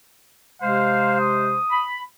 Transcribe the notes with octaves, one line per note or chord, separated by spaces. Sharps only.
C3 G#3 C5 F5
D#6
B5